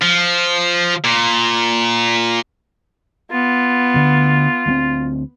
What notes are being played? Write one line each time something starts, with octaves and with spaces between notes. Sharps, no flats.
F3
A#2
B3 F4
D2 D3
D2 G#3 C4